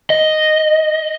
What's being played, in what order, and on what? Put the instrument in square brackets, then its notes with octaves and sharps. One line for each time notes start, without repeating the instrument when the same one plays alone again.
[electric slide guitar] D#5